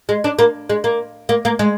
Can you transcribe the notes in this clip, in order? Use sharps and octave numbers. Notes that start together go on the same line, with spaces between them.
G#3
D4
A#3
G#3
A#3
A#3
A#3
G#3